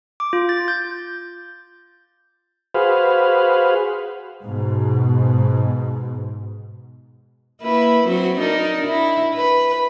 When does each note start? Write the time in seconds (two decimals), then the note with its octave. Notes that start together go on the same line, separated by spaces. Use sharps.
0.20 D6
0.33 F4
0.49 A6
0.68 G6
2.75 F#4 G#4 B4 C5 F5
4.43 G#2 B2
7.62 A#3 E4 B4
8.06 F#3 C4 F#4
8.38 D4 D#4 A#4
8.87 E4
9.35 B4